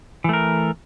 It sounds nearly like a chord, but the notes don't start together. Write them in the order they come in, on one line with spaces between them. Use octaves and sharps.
E3 A3 A#4